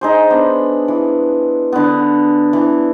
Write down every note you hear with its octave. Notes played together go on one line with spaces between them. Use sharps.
D#4 G#4 C5
B3 D4
E3
D3 B3
E3